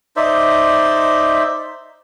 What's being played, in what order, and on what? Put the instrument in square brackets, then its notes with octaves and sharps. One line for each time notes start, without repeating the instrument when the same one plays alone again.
[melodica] D#4 C5 D5 E5